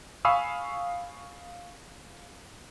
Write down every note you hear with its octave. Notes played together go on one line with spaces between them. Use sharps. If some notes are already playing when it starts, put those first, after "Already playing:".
F5 G#5 B5 C#6 D#6 E6